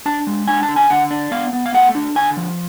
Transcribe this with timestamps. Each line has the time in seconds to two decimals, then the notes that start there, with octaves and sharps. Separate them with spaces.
0.06 D4 A5
0.27 G#3
0.48 D4 G#5
0.63 A5
0.68 D3
0.76 G#5
0.90 D3 F#5
1.10 D4
1.31 B3 F5
1.53 B3
1.66 F5
1.74 A3 F#5
1.95 D4
2.15 D3 G#5
2.37 F3